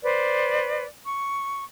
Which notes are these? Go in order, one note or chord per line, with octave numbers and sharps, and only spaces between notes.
B4 C5 D5
C#6